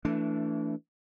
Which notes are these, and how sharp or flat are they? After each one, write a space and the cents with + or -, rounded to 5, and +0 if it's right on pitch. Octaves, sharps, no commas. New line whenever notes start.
E3 +0 A3 +15 D4 -25